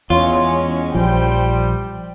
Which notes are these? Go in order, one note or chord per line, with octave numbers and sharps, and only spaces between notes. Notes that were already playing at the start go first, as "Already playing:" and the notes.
E2 G#3 C#4 F4 C#5
A#1 F3 G3 C5 G5